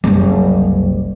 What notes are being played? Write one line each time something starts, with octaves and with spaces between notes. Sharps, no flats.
F#1 C2